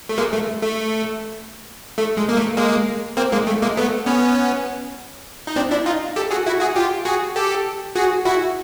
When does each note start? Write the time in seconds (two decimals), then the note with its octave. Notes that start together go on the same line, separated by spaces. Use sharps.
0.09 A3
0.18 G#3 A#3
0.33 A3
0.62 A3
1.98 A3
2.17 G#3
2.29 A#3
2.37 A3
2.57 G#3 A#3
3.17 A#3 C4
3.32 G#3 A#3
3.47 A3
3.62 G#3 A#3
3.77 A3 B3
4.06 B3 C#4
5.47 D#4
5.56 C4 D4
5.71 D4 E4
5.86 D#4 F4
6.16 G4 A4
6.31 F#4 G#4
6.46 E4 F#4
6.61 F#4 G#4
6.76 F4 G4
7.05 F#4 G#4
7.36 G4 A4
7.96 F#4 G#4
8.25 E4 F#4